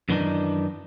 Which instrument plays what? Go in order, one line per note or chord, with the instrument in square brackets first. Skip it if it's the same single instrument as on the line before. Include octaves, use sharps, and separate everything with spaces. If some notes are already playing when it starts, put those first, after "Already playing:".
[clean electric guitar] F#2 D#3 E3 G3 D4 D#4